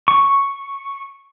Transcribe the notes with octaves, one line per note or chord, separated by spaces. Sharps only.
C#6